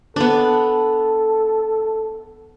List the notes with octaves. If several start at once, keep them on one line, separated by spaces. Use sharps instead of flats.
B3 D4 A4